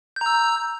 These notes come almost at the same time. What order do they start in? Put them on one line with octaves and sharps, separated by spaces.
G6 A#5 E6